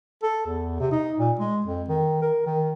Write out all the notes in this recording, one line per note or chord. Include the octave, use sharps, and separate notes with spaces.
A4
E2
C3
D#4
A#2
G#3
F2
D#3
A#4
D#3